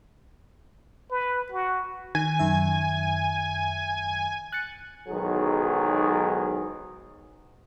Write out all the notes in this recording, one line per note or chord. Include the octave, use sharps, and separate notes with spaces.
B4
F#4
D#3 G#5
F#2 D#3 E5
F#6 A6 C#7
B1 E2 G#2 D#3 F#3 G#4